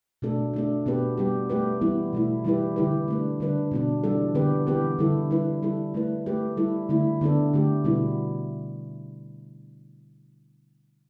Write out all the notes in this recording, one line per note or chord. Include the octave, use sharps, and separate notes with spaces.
B2 A3 D4 A4
A3 D4 A4
B2 B3 G4 B4
G3 B3 G4
A3 G4 B4
E3 G3 B3 E4
B2 A3 E4
E3 G3 E4 G4 B4
D3 G3 E4 G4 B4
A3 D4 B4
D3 G3 D4 B4
B2 B3 D4
E3 G3 D4 A4
D3 B3 G4 B4
E3 B3 G4 B4
D3 G3 E4 A4
G3 E4 B4
G3 E4 A4
A3 E4 B4
A3 G4 B4
G3 E4 A4
D3 A3 E4
D3 B3 D4 A4
D3 A3 G4
B2 G3 B3 E4